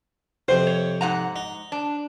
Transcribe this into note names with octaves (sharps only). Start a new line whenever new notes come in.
F2 C3 C5
C#5
G#2 F#5 A#5
D#4
D4